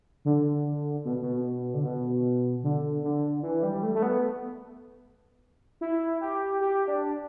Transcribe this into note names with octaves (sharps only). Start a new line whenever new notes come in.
D3
B2
B2
D3
B2
D3
D3
E3
G3
A3
A3
B3
E4
G4
G4
D4